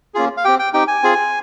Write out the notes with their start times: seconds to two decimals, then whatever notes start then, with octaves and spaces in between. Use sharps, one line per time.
0.15 A#3 C#4 F4 G#4
0.37 F5
0.45 C4 G4 G5
0.59 G5
0.73 C4 D#4 G4 G5
0.88 G#5
1.03 C4 F4 G#4